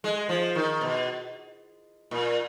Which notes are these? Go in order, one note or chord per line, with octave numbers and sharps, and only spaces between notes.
G#3
F3
D#3
B2
A#2